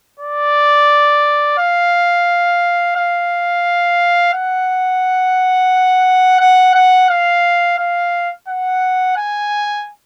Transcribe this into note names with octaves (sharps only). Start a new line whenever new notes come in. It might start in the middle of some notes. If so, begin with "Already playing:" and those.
D5
F5
F5
F#5
F#5
F#5
F5
F5
F#5
G#5